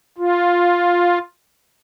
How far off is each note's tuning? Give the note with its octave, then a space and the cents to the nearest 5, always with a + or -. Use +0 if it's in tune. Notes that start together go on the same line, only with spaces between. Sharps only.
F4 +5